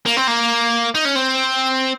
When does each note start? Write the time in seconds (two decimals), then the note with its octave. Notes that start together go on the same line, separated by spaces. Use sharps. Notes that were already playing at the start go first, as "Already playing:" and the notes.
0.06 A#3
0.17 C4
0.27 A#3
0.95 D#4
1.05 C#4
1.15 C4